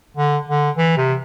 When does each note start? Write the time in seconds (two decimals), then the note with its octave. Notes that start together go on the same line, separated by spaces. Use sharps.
0.17 D3
0.49 D3
0.77 E3
0.97 C3